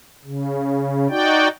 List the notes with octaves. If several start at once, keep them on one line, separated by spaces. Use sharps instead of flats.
C#3
D#4 F#4 D5 G5